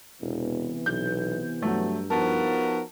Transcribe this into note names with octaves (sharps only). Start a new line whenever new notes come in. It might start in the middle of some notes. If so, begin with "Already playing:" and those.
E1 C3 E3 B3
B1 G6
G2 F#3 A3
F3 B3 D#4 F#4 A#4 A5